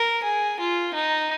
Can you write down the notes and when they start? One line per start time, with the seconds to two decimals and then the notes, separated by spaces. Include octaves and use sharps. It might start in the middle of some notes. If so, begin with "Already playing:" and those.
Already playing: A#4
0.24 G#4
0.60 F4
0.94 D#4